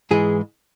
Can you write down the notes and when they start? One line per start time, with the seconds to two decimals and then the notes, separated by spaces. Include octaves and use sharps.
0.11 G#2 E3 G#3 G#4